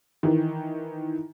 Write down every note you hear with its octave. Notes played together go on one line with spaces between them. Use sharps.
D#3 E3